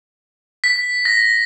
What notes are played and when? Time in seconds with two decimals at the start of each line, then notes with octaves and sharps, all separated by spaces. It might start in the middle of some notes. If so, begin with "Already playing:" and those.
0.64 B6
1.05 A#6